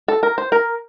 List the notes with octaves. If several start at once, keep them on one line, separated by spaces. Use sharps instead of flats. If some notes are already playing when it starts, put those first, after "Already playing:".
A4
A#4
C5
A#4